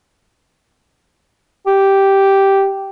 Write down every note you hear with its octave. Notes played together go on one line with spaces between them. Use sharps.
G4